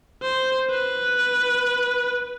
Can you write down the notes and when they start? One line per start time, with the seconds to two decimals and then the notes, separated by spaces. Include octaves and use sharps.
0.22 C5
0.70 B4